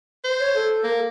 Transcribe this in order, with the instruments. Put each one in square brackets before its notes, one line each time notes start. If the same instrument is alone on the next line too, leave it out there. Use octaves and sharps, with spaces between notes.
[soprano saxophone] C5
[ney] C#5
A4
[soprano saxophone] A#3